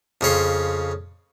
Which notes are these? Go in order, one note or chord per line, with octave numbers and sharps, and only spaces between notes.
F2 C#3 C#5 C6